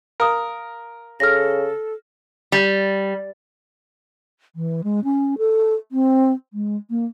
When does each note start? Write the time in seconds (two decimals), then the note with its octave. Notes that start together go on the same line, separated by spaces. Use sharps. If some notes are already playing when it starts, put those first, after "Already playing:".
0.20 A#4 F5 D#6
1.20 C#3 A4 F6 A#6
2.52 G3
4.56 E3
4.84 G#3
5.04 C#4
5.38 A4
5.92 C4
6.53 G#3
6.90 A#3